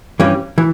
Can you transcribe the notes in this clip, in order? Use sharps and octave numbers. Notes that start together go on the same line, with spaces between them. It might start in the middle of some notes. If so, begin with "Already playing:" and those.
G2 E3 G3 C#4
E3